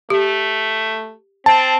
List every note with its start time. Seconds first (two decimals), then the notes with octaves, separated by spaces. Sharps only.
0.10 A3 G4
1.46 C4 A5